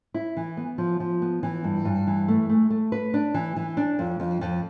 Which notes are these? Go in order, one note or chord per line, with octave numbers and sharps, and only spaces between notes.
E4
E3
B3
F3
F3
B3
E3
G2
G2
E3
A3
A3
A3
B4
D4
E3
E3
D4
F2
F2
F2